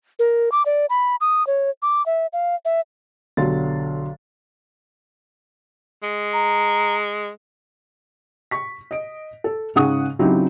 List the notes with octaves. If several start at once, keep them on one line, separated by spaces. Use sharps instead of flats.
A#4
D6
D5
B5
D#6
C#5
D6
E5
F5
E5
B1 D3 F#3 G4 C6 A6
G#3
A#5
C#6 B6
D#5 D7
A4
G#2 C#3 G#4 F#5 C#6 D#6
C#3 F#3 C4 D#4 E4 G4